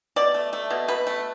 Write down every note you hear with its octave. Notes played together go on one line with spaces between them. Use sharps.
B2 D5
A3
A3
B2
B2 B4
A3